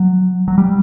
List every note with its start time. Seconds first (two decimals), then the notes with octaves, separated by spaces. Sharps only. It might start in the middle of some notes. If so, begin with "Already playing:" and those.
Already playing: F#3
0.48 F#3
0.58 G3